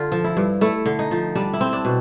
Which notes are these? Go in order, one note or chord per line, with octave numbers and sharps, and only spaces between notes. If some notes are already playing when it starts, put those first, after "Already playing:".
Already playing: D3 F4
F3
E4
G2
A3 E4
D3
D#4
F3
G3 D4
E4
C4
D4
B2